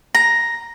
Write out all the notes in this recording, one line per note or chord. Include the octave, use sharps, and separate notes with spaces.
A#5